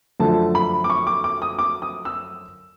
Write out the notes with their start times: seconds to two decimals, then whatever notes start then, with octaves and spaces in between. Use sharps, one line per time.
0.20 F#2 D3 F3 A3 A5
0.55 B5
0.84 D6
0.90 C#6
1.07 D6
1.24 D6
1.42 D#6
1.59 D6
1.82 D#6
2.05 E6